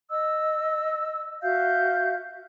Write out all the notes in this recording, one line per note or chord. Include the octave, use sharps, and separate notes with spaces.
D#5 E6
F#4 E5 F5 G6